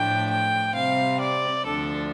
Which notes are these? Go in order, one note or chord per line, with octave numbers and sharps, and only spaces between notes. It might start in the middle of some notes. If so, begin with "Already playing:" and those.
Already playing: A2 F3 A3 D4 G5
G5
C3 G3 C4 F5
D5
D2 D3 F3 D4 A4